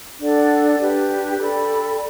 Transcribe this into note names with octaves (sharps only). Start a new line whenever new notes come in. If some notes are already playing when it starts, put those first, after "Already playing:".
D4 A4 D5 F#5
D4 G4 B4
A4 D5 G5 B5